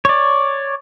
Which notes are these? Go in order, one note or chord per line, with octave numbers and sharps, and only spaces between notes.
C#5 D5